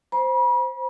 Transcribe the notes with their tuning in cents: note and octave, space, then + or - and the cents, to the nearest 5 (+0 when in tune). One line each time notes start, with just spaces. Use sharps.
C5 +0 B5 -40